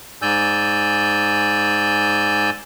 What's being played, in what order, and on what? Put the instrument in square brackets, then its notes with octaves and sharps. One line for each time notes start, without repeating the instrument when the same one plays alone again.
[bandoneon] G#2 D5 G#5 E6 G6